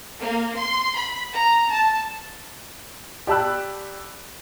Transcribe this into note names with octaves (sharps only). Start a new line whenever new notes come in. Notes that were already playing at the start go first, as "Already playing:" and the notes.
A#3
C6
B5
A#5
A5
G4 D5 A5 B5 E6 F#6